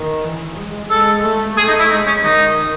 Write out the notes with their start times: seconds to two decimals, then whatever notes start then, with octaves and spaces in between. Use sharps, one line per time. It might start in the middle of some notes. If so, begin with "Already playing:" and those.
Already playing: D#3
0.24 E3
0.57 G#3
0.90 G#3 A4
1.24 A3
1.58 A3 G#4
1.68 D#4
1.80 E4
1.91 G#3 D#4
2.07 C#4
2.24 D#3 D#4